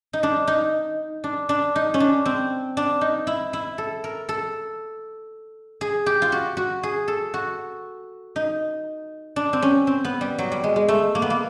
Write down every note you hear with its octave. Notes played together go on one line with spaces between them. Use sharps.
D#4
D4
D#4
D4
D4
D#4
C#4
D4
C4
D4
D#4
E4
E4
A4
A#4
A4
G#4
G4
F4
F#4
F#4
G#4
A4
F#4
D#4
D4
C4
C#4
C4
B3
G3
F#3
G3
G#3
G#3
A3
A#3
B3
A#3